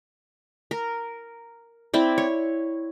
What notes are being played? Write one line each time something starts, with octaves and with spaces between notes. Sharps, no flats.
A#4
C4 E4 D5
C#5